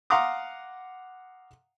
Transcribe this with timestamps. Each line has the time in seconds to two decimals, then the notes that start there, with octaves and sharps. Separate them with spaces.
0.10 F5 F#5 A#5 C6 D6 D#6